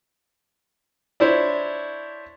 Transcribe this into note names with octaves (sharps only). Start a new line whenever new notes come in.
D4 E4 C5 C#5